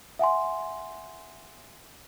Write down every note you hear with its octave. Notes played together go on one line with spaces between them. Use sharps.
E5 F#5 G#5 C6